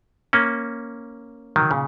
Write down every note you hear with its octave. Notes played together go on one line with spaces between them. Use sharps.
A#3 C#4
D#3 F#3
A#2 C#3